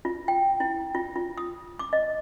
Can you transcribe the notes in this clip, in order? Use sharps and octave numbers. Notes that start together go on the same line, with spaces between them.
F4
G5
E4
F4
F4
D#6
D6
D#5